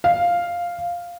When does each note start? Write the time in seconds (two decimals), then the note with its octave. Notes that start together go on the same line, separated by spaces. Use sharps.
0.04 F5